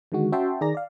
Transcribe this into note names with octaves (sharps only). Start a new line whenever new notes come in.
D3 D#3 G#3 F#4
C#4 F#4 E5 G5 A5 C6
D#3 G#4 D5 A#5 A#6
D5 F5